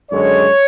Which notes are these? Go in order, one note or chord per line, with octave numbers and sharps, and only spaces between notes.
F#2 D3 G#3 C#5